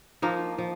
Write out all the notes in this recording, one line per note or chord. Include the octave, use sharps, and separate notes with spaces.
F3 A#3 D#4
F3